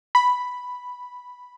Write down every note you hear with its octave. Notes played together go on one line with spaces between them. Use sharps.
B5